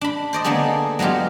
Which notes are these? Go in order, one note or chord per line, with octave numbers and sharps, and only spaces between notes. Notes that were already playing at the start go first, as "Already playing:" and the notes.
D4 B5
C5 D5 D#5
D3 A#3 B3 D4 G#4 A4
F#3 G#3 B3 F4 G4